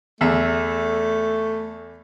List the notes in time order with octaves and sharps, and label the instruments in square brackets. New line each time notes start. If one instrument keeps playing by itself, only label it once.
[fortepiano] E2 E5 [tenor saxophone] A3